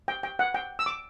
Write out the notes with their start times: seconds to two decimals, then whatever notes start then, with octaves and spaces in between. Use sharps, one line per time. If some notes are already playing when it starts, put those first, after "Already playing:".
0.08 G5
0.23 G5
0.39 F#5
0.54 G5
0.79 E6
0.86 D6